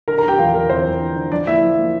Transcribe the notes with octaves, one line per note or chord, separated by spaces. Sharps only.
D3 A#4 A#5
A#4 A#5
D3 G4 G5
E2 F4 F5
E2 A#4
E2 C4 C5
E2
D3
D3
F3 D4 D5
A#3 E4 E5
F3
A#3